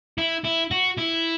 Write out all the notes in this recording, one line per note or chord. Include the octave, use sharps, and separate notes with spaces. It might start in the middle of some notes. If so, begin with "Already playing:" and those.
E4
E4
F#4
E4